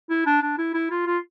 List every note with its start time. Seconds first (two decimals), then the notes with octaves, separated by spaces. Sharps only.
0.10 E4
0.26 D4
0.43 D4
0.58 E4
0.74 E4
0.90 F4
1.06 F4